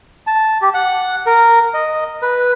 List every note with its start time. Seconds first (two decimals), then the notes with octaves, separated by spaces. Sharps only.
0.27 A5
0.62 G4
0.74 F#5
1.26 A#4
1.74 D#5
2.22 B4